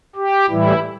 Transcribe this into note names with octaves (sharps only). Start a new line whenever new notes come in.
G4
A2 E3 G3 E4